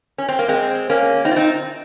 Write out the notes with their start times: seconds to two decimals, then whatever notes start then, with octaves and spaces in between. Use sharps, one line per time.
0.18 C#4
0.29 C4
0.39 A#3
0.48 G#3 C4
0.90 A#3 C#4
1.25 C4 D#4
1.31 F4
1.36 C4 D#4